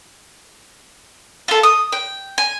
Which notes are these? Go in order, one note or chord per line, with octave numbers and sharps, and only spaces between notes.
F4 A4
D#6
G5
G#5